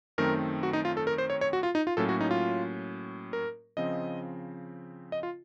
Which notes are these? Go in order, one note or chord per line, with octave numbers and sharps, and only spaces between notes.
F#2 D#3 A3 C4 A#4
F#4
D#4
F4
A4
A#4
C5
C#5
C#5
F#4
F4
D#4
F4
A2 F#3 A#3 C#4 A4
F#4
D#4
F4
A#4
C#3 F3 C4 D#5
D#5
F4